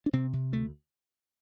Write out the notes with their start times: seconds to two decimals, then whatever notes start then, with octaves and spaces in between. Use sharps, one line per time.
0.06 D4
0.13 C3 C4
0.33 C3
0.52 D2 A3